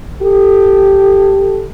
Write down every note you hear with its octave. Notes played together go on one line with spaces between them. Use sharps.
G4 A4